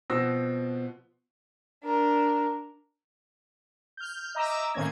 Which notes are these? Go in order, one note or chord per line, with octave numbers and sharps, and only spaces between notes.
B2 F3 B3 C4 E6 A#6
D4 A#4
F6 G6
D#5 E5 A#5 D6 E6
A2 D#3 A#3 C4 C#4 G#6